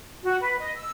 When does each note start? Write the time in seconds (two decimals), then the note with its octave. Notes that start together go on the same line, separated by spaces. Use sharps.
0.23 F#4
0.41 B4
0.59 D#5
0.75 E6